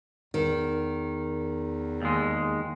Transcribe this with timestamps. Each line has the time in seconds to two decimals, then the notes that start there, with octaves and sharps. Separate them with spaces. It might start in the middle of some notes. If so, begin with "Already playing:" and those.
0.34 E2 D#3
2.02 D#2 G#3